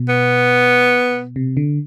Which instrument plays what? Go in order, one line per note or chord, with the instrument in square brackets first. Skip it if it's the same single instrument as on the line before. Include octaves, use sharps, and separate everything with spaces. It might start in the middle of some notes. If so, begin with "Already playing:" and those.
Already playing: [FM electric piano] B2
[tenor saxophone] B3
[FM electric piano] C3
D3